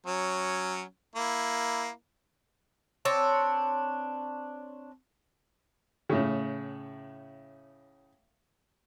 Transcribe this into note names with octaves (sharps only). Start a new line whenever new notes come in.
F#3 C#4
A#3 E4
C4 D4 C#5 A5
A2 C#3